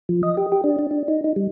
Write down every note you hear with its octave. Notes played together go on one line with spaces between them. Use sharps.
F3
D#5
G4
G4
D4
D4
D4
D#4
D#4
G3